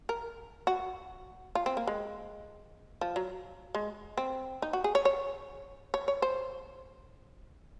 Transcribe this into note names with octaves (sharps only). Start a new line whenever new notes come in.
A#4
F#4
F4
C4
A#3
G#3
F3
F#3
G#3
C4
D#4
F#4
G#4
C#5
C#5
C#5
C#5
C5